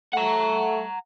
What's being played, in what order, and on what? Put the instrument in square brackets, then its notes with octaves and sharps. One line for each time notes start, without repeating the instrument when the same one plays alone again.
[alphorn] A3 [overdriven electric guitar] F#5 A#5